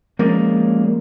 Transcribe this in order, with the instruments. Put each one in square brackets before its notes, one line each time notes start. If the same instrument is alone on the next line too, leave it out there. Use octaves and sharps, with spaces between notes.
[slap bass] F3 G#3 [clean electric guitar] A#3 C#4